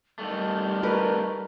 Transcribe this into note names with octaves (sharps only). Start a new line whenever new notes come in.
D#3 G3 A3
A#4 B4